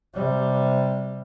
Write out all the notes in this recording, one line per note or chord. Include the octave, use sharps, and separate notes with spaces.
C3 G3